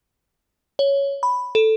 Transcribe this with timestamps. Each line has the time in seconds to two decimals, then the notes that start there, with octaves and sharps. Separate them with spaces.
0.79 C#5
1.23 B5
1.55 A4